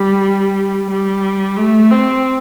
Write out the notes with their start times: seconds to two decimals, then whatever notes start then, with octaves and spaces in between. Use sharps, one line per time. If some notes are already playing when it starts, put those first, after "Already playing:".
Already playing: G3
0.90 G3
1.57 A3
1.91 C4